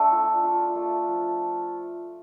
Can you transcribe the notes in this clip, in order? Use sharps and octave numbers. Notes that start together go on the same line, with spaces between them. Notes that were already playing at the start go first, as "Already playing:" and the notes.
Already playing: A3 D4 A4
F4
F4
A3
F3